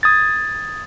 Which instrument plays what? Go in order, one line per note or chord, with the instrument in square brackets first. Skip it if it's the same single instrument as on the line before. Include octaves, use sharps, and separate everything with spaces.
[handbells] D#6 G#6 A6